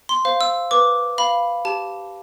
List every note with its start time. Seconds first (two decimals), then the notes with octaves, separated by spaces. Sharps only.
0.09 C6
0.25 C5 F5
0.41 E6
0.71 B4 D6
1.18 F5 B5
1.65 G4 A5